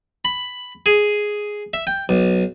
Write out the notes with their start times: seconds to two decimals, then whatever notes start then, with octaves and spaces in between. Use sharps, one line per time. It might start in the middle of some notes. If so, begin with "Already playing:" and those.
0.25 B5
0.86 G#4
1.73 E5
1.87 G5
2.09 B1